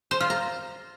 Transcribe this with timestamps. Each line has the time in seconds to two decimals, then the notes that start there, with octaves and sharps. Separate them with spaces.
0.11 C5
0.21 F4
0.30 A#5